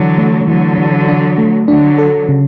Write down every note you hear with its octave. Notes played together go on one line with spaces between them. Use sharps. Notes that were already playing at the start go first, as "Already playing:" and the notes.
Already playing: D3 E3 F#3
A3
D3 E3 F#3
E3
D4
A3
D3 F#3 D4
A4
C#3